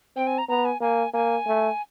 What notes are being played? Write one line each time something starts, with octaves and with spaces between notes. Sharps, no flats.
C4 G5
G#5
A#5
B3 A#5
G#5
A#3 G#5
A#3 G#5
A3